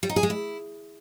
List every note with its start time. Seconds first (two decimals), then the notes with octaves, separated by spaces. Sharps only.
0.03 G3
0.09 D#4
0.16 G#4
0.23 G#3
0.30 E4